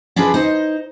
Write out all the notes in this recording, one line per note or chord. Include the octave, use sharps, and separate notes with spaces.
C#4 D4 E4 F4 G#4 B4
D#4 C5 D#5